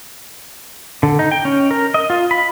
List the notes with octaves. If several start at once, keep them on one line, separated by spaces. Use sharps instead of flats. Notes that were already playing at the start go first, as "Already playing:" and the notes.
D3
D#4
G5
C#4
A#4
D#5
F4
B5